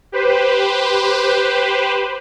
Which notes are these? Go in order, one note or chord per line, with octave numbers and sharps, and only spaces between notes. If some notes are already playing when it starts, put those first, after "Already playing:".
G4 B4 C5